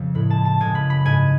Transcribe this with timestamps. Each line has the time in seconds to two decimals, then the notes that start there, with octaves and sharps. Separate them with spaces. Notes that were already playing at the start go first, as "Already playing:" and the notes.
Already playing: F2 C#3 F3
0.15 A2 G#3 B5
0.30 A5
0.45 A5
0.60 F#2 C#3 G#3 G#5
0.75 B5
0.90 B5
1.05 G#2 G#3 G#5